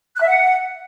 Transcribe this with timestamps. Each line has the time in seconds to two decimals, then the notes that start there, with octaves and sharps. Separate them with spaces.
0.16 F#6
0.22 E5
0.27 F#5